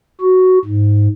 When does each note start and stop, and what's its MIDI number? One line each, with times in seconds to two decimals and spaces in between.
0.21 0.59 66
0.65 1.08 44